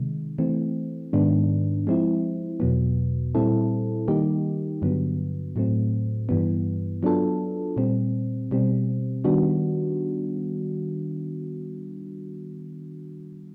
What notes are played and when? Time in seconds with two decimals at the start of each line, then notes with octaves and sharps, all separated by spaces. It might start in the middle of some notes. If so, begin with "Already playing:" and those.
Already playing: C3 D#3 G#3
0.39 E3 A3 C4
1.13 G#2 D#3 G#3 B3 D4
1.87 F3 G#3 C4 E4
2.60 E2 B2 F#3 B3
3.35 A#2 G3 C4 E4 A4
4.08 D#3 G3 A#3 D#4 G4
4.82 G2 D3 F#3 B3
5.56 A2 F#3 A3 C4
6.29 G2 E3 G3 B3
7.03 F#3 B3 D4 F4 A4
7.77 A#2 G3 C4
8.51 B2 G3 C4
9.24 D#3 G3 B3 D4 F#4